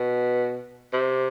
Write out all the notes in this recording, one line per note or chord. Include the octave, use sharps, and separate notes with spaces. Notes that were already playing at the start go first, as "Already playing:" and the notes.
Already playing: B2
C3